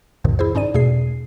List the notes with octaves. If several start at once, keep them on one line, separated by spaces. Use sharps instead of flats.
C2 F2 A2 C3 D#3
E4 G#4 C5
G#2 C#4 D#4 D5 D#7
E2 B2 A3 G#4 C7